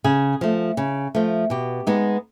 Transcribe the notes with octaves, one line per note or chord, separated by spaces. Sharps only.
C#3 G#4
F3 A3
C#3
F3 A3
B2 G4
G#3 B3 D#4